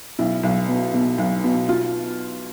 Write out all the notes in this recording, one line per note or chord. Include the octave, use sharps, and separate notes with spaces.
B1 E4
B1
B2
B2
B1
B2
F4